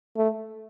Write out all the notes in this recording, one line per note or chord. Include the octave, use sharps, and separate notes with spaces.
A3